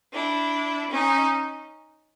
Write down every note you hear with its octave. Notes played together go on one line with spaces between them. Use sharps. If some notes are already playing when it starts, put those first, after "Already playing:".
D4 E4
C#4 D#4